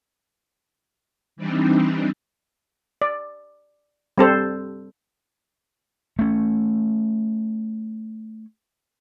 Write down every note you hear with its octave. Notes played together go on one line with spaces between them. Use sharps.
E3 G3 C4 D4 D#4
D5
G3 C4 A4 C5
A3 C#4